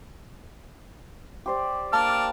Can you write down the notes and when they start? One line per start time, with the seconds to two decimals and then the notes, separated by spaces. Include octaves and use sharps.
1.46 G4 C5 D5
1.93 A#3 D4 A5 D6 F6